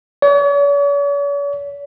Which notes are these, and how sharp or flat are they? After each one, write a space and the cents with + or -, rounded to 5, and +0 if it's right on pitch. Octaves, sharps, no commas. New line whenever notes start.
C#5 +45